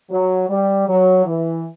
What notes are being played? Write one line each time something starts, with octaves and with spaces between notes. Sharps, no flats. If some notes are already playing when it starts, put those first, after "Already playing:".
F#3
G3
F#3
E3